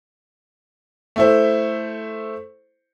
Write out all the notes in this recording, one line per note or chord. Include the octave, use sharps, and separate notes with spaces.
A3 E4 C5